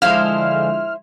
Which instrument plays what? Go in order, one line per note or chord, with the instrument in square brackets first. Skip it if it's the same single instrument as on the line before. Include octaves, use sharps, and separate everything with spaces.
[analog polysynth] D3 F3 G#3 [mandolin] E4 C5 [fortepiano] F5 [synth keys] F6